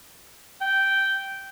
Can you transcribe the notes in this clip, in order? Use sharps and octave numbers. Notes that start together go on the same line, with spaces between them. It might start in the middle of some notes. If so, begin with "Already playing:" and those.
G5